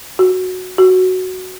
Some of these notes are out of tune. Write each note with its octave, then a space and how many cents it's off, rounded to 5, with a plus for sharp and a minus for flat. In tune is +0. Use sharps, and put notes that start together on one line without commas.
F#4 -5
F#4 +5